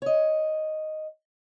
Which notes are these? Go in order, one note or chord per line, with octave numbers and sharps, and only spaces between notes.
C#5 D#5